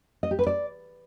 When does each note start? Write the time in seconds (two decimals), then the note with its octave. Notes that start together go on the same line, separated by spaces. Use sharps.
0.23 D#5
0.31 G4
0.39 B4
0.47 D5